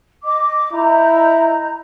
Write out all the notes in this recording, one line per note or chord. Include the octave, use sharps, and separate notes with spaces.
D#5 D6
E4 D#5 A#5 G6